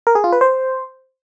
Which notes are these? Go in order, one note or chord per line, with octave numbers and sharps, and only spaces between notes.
A#4
G#4
F4
B4
C5